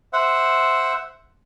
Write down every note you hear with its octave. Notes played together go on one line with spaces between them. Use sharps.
C5 E5 F#5